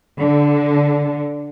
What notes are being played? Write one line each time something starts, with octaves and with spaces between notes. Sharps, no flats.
D3